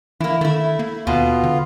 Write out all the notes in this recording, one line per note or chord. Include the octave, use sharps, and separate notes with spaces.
E3 A#3 E4
D#3 A3 E4
A#3
D#2 B2 B3 F4
D3